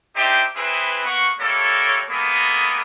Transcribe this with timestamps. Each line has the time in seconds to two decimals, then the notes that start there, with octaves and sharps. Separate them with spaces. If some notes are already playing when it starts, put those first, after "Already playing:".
0.15 D4 D#4 G4 C5 E5 G5
0.55 C4 E4 G#4 B4
1.05 A#3 B3 F#5 C#6
1.39 G3 A3 A#3 A4 C#5
2.09 G#3 A#3 B3 A4 B5 D#6